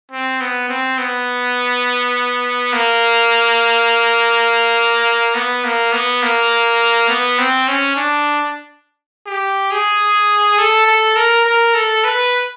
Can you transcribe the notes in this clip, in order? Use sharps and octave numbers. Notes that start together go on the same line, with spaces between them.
C4
B3
C4
B3
A#3
B3
A#3
B3
A#3
B3
C4
C#4
D4
G4
G#4
A4
A4
A#4
A#4
A4
B4